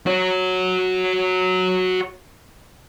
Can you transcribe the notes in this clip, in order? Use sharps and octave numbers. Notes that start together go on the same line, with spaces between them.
F#4 C#5